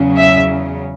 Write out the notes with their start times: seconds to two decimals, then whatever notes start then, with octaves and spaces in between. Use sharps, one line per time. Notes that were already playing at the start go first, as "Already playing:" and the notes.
Already playing: E2 C#3 F#3
0.18 E5